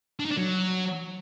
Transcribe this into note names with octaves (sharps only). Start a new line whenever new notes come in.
D4
D#4
D4
F#3